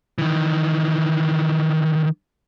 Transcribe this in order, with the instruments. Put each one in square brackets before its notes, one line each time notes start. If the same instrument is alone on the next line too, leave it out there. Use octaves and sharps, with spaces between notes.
[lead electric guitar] D#3 E3